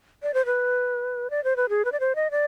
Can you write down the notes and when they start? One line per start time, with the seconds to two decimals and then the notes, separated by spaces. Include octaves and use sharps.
0.23 D5
0.34 C5
0.46 B4
1.30 D5
1.44 C5
1.56 B4
1.69 G#4
1.85 B4
1.92 D5
2.00 C5
2.16 D#5
2.31 D5